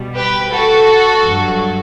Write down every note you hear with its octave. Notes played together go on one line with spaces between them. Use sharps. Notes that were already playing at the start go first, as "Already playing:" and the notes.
Already playing: B2 G3
G4 B4
F#4 A4
G2 F#3